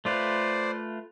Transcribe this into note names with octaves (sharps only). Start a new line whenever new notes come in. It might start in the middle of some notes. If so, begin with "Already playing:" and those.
A3 F4 B4 C5 D5